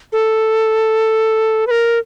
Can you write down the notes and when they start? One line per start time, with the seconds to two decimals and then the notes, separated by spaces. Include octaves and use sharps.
0.12 A4
1.67 B4
1.71 A#4